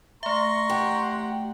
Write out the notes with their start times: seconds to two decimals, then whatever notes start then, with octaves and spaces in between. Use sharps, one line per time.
0.23 A3 E5 A#5 C6 C#6
0.70 G4 F#5